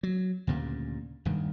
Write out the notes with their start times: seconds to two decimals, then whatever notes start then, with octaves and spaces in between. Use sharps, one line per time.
0.03 F#3
0.47 D2 G2 A#2 C#3
1.25 D#1 G2 D#3